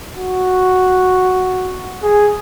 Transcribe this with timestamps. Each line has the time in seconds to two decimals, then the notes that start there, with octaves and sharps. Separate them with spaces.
0.15 F#4
2.03 G#4